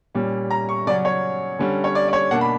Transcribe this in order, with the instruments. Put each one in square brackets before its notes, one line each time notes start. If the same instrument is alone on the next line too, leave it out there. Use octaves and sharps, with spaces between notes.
[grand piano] A#2 G3 C#4
A#5
C#6
C#3 F#3 C#4 D5
C#5
D3 G3 C#4
C#5
D5
D5
C#5
B2 A#3 D4 F#5
B5